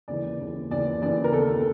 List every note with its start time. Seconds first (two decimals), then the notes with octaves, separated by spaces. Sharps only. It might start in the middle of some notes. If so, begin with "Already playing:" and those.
0.08 D#2 C#3 E3 D5
0.40 D#2 C#3 E3
0.70 D#2 C#3 E3 D5
1.01 D#2 C#3 E3 D5
1.24 A#4
1.32 D#2 D#3 A4